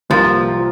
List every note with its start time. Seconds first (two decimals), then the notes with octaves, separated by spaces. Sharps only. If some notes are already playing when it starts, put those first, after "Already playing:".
0.10 C2 C3 F3 A#3 F4 A#4